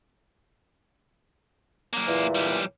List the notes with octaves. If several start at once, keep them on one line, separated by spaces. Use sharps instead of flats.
F#2 A#3
E2 A#2 E3
B1 G3